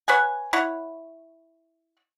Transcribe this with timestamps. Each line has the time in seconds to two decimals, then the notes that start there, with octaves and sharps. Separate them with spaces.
0.08 B4 C#5 F#5 G#5
0.53 E4 C#5 F#5